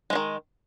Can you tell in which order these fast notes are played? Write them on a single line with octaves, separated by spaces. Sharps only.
G#3 F3 D#3